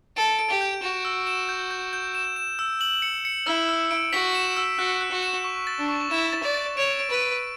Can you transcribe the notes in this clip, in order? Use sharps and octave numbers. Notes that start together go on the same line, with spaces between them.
A4 D7
D7
G4
G6
F#4 E7
E6
E7
G6
G6
G6
E7
E7
E6
F#7
C#7
C#7
E4 E6
E6
D7
F#4 B6
E7
E6
F#4 F#6
F#6
F#4
E7
C#6
A6
D4
C#6
E4 E7
A6
D5
A6
C#5 D7
D7
B4
D7